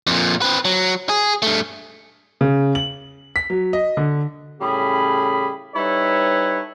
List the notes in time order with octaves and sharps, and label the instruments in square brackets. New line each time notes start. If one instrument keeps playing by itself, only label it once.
[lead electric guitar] F2 A#2
C4 B4
F#3
G#4
G2 A3
[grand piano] C#3
F#7
B6
F#3
D#5
D3
[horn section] A2 C#3 G3 G#4 B5
G3 D#4 E4 A4 B4 C#5